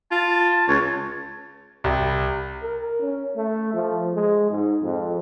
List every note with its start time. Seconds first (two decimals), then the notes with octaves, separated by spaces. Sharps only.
0.11 F4 A5
0.68 C#2 C#5
1.84 C2
2.63 A#4
3.00 C#4
3.36 A3
3.73 F3
4.14 G#3
4.50 G#2
4.82 F2